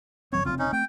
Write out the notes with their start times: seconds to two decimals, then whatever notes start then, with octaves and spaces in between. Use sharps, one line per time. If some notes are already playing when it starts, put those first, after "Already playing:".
0.33 G#1 F#3 C4 C#5
0.46 F1 C#3 C4 F4
0.59 C#4 D#4
0.73 A3 C4 G5